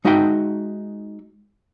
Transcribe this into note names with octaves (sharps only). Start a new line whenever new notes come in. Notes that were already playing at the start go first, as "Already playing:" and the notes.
G#3 D#4 F#4 E5 F#5 G5